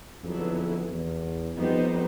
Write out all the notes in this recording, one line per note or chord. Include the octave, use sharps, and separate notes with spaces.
F2 D3 F#3 B3 E4 G#4
E2
F2 G3 B3 D#4 G4 C5